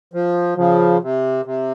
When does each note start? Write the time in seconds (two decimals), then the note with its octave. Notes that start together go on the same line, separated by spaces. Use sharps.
0.14 F3
0.57 C#3 F3
1.02 C3
1.45 C3